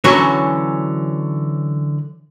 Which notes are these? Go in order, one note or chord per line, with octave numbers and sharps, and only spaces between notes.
D3 E3 F#3 C#4 F#4 C#5